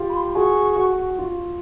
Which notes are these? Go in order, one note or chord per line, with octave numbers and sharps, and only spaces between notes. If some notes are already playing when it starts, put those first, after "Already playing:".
Already playing: F4 G4
B5
C6
F#4 G#4 C#6
F#4
F4